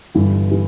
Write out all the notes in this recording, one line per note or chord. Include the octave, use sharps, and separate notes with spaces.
G1 G2 E3
E3